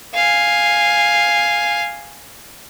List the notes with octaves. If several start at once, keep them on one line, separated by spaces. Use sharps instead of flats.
F5 G#5